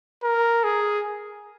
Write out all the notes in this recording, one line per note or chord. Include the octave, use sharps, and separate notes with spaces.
A#4
G#4